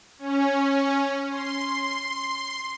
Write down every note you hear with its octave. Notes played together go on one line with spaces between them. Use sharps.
C#4
C6